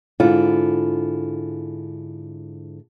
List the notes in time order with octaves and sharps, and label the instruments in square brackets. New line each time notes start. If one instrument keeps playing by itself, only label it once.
[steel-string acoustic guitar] G#2 D3 E4 F4